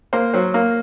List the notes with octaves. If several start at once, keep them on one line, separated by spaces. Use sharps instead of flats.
A#3 C5
F#3 C5
A#3